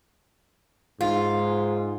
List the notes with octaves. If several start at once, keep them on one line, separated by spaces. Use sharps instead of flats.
G#2 F4